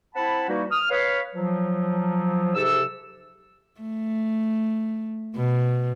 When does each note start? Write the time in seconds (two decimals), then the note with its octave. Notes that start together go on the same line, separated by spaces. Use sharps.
0.15 C4 E4 F#5 A5 B5
0.48 E3 G3 A#3 D#4 F#4
0.71 D#6 F6
0.90 B4 C#5 F5
1.35 F3 F#3
2.55 G#2 C3 G4 A4 E6
3.81 A3
5.36 B2